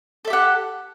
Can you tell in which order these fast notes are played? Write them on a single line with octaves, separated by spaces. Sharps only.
A4 E5 G4 F#5